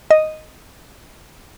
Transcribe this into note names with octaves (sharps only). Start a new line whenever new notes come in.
D#5